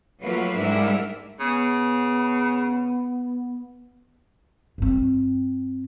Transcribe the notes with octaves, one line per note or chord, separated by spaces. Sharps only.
F#3 A3 A#3 F4 B4
G#2 G3 D4 E4 A#4 E5
C#3 B3
G2 C4